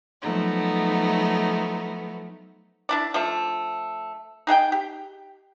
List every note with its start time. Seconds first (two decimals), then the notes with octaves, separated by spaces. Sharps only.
0.22 F3 F#3 A3 B3 D#4
2.89 D4 E4 D5
3.14 F3 A3 D4
4.47 D#4 G#4 F#5 G5
4.72 G4